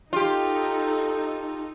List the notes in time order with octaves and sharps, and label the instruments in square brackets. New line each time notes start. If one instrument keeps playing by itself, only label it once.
[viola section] D#4 A4 [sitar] F4 G4